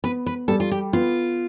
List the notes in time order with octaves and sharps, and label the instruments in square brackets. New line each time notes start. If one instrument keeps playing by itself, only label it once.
[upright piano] B3 [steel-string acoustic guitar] B4
[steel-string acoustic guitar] B4
[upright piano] G3 [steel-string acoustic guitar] A4
[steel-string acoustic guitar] F4
G4
[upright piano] B3 [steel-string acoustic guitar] F4